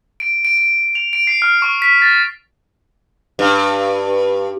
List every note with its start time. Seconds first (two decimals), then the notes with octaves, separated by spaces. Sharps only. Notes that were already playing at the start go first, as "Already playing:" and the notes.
0.20 D7
0.45 D7
0.57 D7
0.95 F7
1.13 D7
1.27 C7
1.42 F6
1.62 C#6
1.82 B6
2.02 A6
3.39 G2